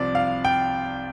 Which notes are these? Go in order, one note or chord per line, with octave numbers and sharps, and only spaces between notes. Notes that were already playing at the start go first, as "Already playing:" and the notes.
Already playing: C2 C3 F3 D5
F5
G5